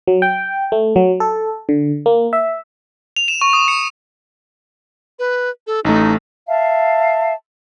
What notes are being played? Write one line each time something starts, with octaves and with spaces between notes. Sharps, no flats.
F#3
G5
A3
F#3
A4
D3
A#3
E5
F7
E7
C#6
D#6
C#7
B4
A4
A1 A3 D#4
E5 F5 A5